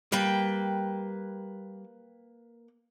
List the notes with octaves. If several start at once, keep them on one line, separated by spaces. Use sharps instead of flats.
G3 A#3 B4 G5